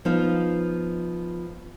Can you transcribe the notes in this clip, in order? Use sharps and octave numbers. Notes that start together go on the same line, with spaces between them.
F3 B3 D#4 C5 F5